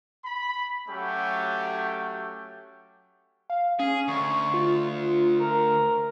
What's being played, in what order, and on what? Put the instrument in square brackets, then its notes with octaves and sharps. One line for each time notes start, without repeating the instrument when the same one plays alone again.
[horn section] B5
F#3 A3 C#4 G4
[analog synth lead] F5
[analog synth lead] C#4 [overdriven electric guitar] G#4
[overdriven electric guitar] D2 [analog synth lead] C#6
[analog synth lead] F4
[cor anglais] A#4